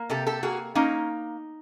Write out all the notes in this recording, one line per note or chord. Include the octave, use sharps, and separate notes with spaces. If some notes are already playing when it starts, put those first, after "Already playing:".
Already playing: A#3
C3 G4 A4
G4 A4
A#3 F#4 G#4
A#3 C#4 D#4